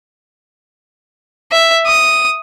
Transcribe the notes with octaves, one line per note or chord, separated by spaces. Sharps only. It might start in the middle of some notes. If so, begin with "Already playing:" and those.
E5
D#6